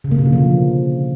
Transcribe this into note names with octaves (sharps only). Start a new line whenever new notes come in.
C#3
A#3
B2
D3
F3